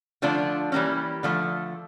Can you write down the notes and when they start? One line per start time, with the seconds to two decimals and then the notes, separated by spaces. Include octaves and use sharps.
0.22 D3 F3 A3 D4 F4
0.72 E3 G3 A#3 C#4
1.23 D3 F3 A3